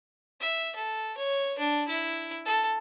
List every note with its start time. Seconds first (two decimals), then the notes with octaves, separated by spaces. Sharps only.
0.41 E5
0.76 A4
1.17 C#5
1.58 D4
1.88 E4
2.45 A4